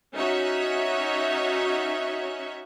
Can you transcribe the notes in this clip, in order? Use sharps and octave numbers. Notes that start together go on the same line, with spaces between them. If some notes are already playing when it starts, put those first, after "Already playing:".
C#4 D#4 F#4 C#5 E5